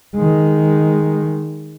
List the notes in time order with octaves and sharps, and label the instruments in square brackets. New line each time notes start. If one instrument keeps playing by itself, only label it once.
[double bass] D#3 G#3